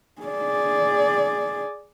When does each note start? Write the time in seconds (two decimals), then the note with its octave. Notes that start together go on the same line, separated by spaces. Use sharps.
0.22 G#4 D5